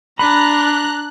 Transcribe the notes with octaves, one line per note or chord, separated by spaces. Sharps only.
D4 A#5 B5 F#6